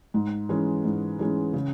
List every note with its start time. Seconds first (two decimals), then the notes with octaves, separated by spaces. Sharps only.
0.14 G#2
0.49 E3 G#3 C#4
0.84 G#2
1.19 E3 G#3 C#4
1.54 C#3